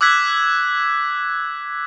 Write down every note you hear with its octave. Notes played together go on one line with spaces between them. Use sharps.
D6 E6 F#6 G#6 B6